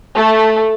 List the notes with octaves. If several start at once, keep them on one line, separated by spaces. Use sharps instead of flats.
A3